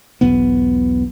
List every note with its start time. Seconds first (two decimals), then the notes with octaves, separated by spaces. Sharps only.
0.21 E1 B1 B3